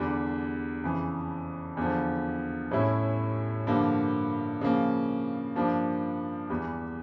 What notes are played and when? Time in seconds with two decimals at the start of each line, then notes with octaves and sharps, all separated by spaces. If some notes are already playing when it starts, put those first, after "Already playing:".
Already playing: E2 D3 G3 D4
0.84 F2 C#3 E3
1.77 E2 D3 F3
2.71 A2 G3 C#4 E4
3.67 G2 D3 F3 A#3
4.61 C#3 F3 A#3
5.56 G2 F3 A#3 D4
6.50 E2 E3 G3